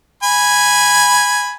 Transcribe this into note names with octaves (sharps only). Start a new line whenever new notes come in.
G#5 B5